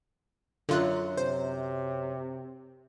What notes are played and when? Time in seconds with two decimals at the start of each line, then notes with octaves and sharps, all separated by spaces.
0.69 F#2 D3 F#3 F4 F#6
1.18 C3 C5